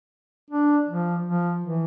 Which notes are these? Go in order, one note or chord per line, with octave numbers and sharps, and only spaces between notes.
D4
F3
F3
E3